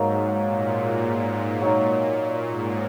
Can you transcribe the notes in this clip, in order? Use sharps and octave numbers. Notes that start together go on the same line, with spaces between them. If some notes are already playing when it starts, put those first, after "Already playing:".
Already playing: G#2 F#3 A#3 D#4
G#2
A#2
A#2
F#3 A#3 D#4
G#2